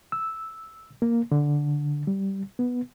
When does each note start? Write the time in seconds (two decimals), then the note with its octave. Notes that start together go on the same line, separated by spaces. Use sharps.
0.12 E6
1.02 A#3
1.32 D3
2.07 G3
2.59 B3